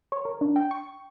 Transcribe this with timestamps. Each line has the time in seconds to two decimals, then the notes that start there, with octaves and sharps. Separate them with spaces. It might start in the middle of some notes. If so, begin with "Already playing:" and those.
0.12 C#5
0.25 A#4
0.41 D4
0.56 G5
0.71 C#6